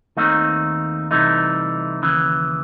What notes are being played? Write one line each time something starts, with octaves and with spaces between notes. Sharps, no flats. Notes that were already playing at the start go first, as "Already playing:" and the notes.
D#2 D#3 A3 C4 D#4
C2 C3 E3 A3 D#4
D#2 C#3 E3